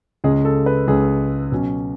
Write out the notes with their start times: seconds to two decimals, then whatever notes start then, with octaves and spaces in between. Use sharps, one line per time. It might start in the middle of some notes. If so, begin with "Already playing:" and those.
0.24 C#2 C#3 G#3 C#4 G#4
0.45 A4
0.66 B4
0.87 C#2 C#3 G#3 C#4 G#4
1.52 B2 F#3 C#4